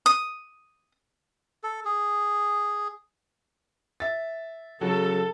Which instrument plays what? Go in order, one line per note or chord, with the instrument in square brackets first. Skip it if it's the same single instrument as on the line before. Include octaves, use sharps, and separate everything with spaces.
[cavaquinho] D#6
[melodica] A4
G#4
[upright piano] E5 A6
[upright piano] C#3 F#3 [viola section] A4